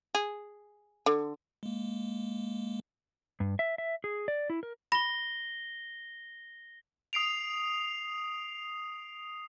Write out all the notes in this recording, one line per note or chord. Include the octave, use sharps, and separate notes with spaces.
G#4
D3
G#3 A#3
G2
E5
E5
G#4
D5
E4
A#4
B5 A#6 G7
D#6 C7 D7 F7